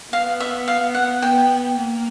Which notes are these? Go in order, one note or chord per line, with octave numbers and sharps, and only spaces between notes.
B3 F5
E5
F5
F#5
B3 G5
A#3